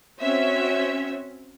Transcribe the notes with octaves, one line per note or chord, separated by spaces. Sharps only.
C4 C#4 F#4 C#5 E5